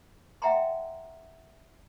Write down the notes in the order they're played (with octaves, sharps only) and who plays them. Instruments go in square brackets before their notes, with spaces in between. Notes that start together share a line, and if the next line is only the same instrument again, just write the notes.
[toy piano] E5 F#5 G5 A5 A#5 C6